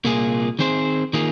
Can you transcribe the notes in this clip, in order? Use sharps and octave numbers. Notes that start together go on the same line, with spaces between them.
C2 A#2 A#3 F4 G#4
D#3 C4 G#4 C5
D#3 A#3 F4 G#4